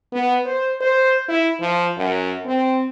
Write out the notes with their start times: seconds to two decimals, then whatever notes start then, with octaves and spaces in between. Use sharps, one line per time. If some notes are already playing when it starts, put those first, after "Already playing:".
0.12 B3
0.45 C5
0.81 C5
1.28 E4
1.60 F3
1.97 F#2
2.45 C4